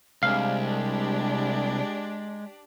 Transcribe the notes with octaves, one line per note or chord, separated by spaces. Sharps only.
C2 G#3 D4 G4 F5